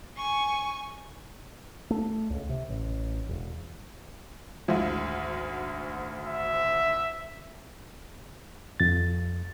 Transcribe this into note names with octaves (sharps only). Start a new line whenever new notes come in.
G#5 C#6
A3
C#2
C3
A1
E1
G#1 D2 F3 G#3 E4
E5
F2 A6